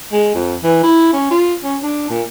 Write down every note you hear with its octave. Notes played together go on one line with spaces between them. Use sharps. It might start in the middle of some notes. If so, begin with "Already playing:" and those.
G#3
F2
E3
E4
C#4
F4
C#4
D4
A#2